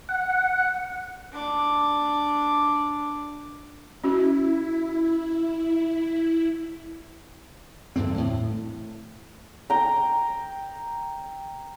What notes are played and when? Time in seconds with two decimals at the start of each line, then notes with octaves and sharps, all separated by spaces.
0.09 F#5
1.33 D4 D6
4.04 C#4 E4 F#4
7.96 E2 G2 D3 C4
8.18 A2
9.70 G5 A#5